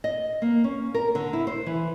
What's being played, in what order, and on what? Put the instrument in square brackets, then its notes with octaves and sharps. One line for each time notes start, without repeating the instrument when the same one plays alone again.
[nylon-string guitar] D#5
A#3
C#4
A#4
D3
E4
C5
E3